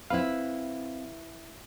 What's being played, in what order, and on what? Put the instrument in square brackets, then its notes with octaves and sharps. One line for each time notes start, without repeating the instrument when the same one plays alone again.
[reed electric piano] C4 F5 [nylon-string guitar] E4 B4